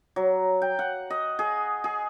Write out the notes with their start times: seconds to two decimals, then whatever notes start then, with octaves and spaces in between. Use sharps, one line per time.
0.16 F#3
0.62 G5
0.79 F#5
1.10 D#5
1.39 G#4
1.84 G#4